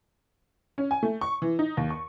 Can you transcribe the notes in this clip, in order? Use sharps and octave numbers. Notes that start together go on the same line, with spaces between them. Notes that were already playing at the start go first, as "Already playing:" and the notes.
C#4
G#5
A3
C#6
E3
D#4
D#2
C#6